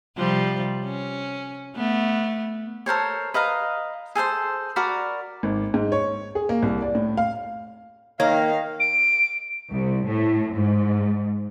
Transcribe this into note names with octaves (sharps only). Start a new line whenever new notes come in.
C3 F3 G3
C#4
A3 B3
A4 A#4 C5 C#5
B4 D#5 F5 A#5
G#4 A4 C5 C6
F#4 A#4 D5 B5
G#1
G#2
C#5
G#4
A#3
C2
D5
A2
F5
D#3 A#3 C#5 F5
D7
C2
A2
G#2